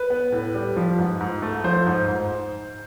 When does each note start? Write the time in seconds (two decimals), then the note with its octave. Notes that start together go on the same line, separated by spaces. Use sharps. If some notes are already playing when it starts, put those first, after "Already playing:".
Already playing: B4
0.10 B3
0.32 A2
0.54 G3
0.76 F3
0.98 G#2
1.21 G#2
1.42 A3
1.64 F3 C5
1.86 G#2
2.08 G#2